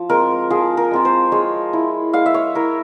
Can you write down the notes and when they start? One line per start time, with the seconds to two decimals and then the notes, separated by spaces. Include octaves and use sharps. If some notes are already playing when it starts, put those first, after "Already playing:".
Already playing: F3
0.09 G#3 C4 F4 A#4
0.50 F3 G#4
0.77 A#4
0.91 G#3 C4 F4
1.05 C5
1.32 G#3 C#5
1.73 E4
2.13 G#3 F5
2.26 E5
2.34 C#5
2.55 E4 A#4